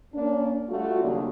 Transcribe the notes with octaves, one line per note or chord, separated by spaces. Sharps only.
A#3 C#4 D4
G3 A3 F4 F#4
D#2 C#3 F#3 G3 A#3 D4